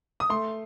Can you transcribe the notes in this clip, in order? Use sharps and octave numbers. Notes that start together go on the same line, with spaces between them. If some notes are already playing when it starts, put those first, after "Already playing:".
D#6
A3 C6